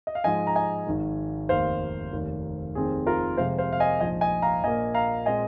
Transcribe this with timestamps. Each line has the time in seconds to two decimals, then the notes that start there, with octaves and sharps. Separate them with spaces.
0.07 D#5
0.15 F5
0.24 G#2 F3 G#3 D#5 G#5
0.47 A#5
0.56 D#5 G#5
0.87 G#1 G#2 D#3
1.49 F1 D#2 D#3 A#3 C5 F5
2.13 F1 D#2 D#3 A#3
2.75 F1 D#2 D#3 C4 G#4
3.07 F4 A#4
3.37 F2 C3 G#3 C5 F5
3.58 C5 F5
3.73 F5
3.80 D#5 G#5
4.00 A#1 G#2 F3 D#5 G#5
4.21 D#5 G#5
4.42 F5 A#5
4.63 A#1 A#2 A#3 D#5 G#5
4.94 F5 A#5
5.26 A#2 G#3 C4 D#5 G#5